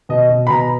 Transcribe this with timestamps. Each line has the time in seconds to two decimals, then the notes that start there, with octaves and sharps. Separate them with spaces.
0.09 B2 D#5
0.29 B2
0.47 B5
0.50 B2 A#5